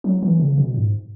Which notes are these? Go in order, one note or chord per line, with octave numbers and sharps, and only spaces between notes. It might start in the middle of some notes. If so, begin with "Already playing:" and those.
F#3
E3
C#3
B2
G#2